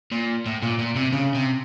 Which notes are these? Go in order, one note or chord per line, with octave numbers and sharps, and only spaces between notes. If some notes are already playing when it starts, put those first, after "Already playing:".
A#2
A2
A#2
A#2
C3
C#3
C3